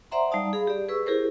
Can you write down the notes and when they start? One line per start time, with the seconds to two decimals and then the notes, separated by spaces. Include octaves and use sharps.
0.11 C5 D5 E5 F#5 A#5 C6
0.31 G3 D#4 D5 F5 A5 D#6
0.53 G#4 F5 B5
0.67 G4 D5
0.89 G#4 B4 C#6 E6
1.06 E4 G4 G#4 A#4 C5